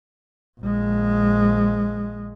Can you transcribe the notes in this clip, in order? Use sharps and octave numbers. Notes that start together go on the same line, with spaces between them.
A#1 G#3